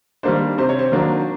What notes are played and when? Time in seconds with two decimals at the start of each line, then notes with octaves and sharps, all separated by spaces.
0.23 D#3 G3 A#3 D4 C5
0.58 C3 C5
0.69 C#5
0.79 C5
0.92 D#3 F#3 A#3 D4